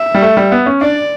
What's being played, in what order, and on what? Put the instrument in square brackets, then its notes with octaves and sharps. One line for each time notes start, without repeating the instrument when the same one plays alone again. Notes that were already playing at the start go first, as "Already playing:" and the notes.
Already playing: [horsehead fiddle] E5
[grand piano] G3
A3
G3
B3
C#4
[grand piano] D4 [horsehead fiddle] D5